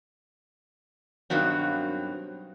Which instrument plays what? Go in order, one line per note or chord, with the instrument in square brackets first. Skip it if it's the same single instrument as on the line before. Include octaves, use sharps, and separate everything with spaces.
[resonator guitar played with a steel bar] G2 B2 D#3 F#3 C4